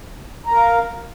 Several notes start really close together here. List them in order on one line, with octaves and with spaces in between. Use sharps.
A#5 A#4 F5